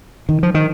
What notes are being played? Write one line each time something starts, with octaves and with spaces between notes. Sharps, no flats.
D#3
F3
D#3